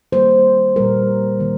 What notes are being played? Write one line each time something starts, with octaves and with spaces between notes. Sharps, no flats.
D#3 G3 A#3 C5
A#2 G3 A#3 A#4
D#3 A#3